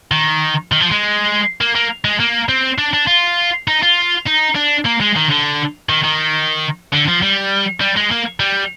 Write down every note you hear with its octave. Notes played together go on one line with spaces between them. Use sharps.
D#3
D#3
F3
G#3
A#3
A#3
G#3
A#3
C4
D4
D4
F4
D#4
F4
D#4
D4
A#3
G#3
D#3
D3
D#3
D#3
D3
F3
G3
G3
G#3
A#3
G3